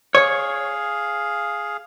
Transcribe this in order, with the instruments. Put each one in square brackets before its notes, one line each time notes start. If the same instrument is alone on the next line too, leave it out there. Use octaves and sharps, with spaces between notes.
[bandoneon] G#4 F5 [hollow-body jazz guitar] C#5